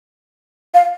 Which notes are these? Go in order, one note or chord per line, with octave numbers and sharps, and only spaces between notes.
F5